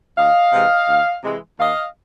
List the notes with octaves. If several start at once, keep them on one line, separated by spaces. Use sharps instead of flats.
D2 D#5 F5
C3 E3 G#3
D2
C3 E3 G#3
D#2 D#5 F5